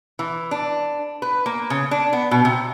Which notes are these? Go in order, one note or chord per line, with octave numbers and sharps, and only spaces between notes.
E3
D4
B4
A#3
C#3
D4
B3
B2
C3